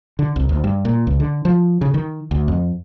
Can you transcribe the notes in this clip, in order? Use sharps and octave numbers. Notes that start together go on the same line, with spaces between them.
D3
C2
D2
G2
A#2
C#2
D3
F3
C#3
D#3
D2
F2